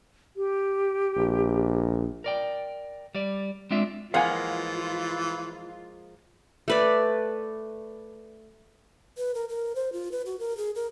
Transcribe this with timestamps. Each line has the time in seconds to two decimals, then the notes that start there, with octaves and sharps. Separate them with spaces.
0.37 G4
1.16 A#1
2.24 A#4 D5 G5
3.15 G3 D5
3.71 G#3 C4 D4 F4 E5
4.14 E3 F3 G#3 A#3 F4 F5 F#5 G#5
6.68 A3 B4 D5
9.17 B4
9.35 A#4
9.49 A#4
9.75 C5
9.93 F4
10.12 B4
10.26 F#4
10.40 A#4
10.57 G#4
10.75 A#4